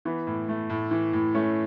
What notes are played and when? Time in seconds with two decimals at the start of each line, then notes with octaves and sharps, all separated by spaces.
0.05 E3 B3
0.27 A2
0.49 A3
0.70 A2
0.91 E3
1.13 A2
1.35 A3 C#4